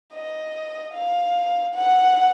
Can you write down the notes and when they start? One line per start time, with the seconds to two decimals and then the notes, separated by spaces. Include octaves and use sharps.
0.13 D#5
0.93 F5
1.75 F#5